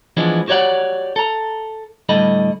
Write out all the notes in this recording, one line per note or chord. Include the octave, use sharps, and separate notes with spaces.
E3 F3 G#3 B3 D4
F#4 G4 C#5 D5 F#5
A4 A#5
A2 D3 G3 A4 D#5 B5